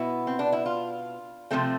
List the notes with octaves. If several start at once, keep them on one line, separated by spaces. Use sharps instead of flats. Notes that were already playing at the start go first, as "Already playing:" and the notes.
Already playing: B2 B3 E4
C4
D4
E4
F4
C3 F3 A3 C4